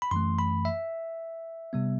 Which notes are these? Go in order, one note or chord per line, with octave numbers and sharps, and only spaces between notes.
B5
F#2 E3 A3 C6
B5
E5
C3 G3 B3